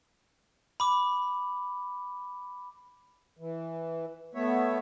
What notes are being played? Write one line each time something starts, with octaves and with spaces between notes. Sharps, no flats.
B5 D6
E3
A3 B3 C#5 E5